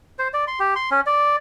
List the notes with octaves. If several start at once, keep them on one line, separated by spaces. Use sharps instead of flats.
C5
D5
C6
G4
C6
C#4
D5